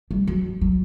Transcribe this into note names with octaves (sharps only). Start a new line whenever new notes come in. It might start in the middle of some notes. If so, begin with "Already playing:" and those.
G3
F#3
F#3